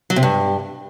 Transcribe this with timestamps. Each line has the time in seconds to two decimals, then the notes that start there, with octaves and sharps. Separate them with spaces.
0.10 F#3
0.16 C3
0.23 G2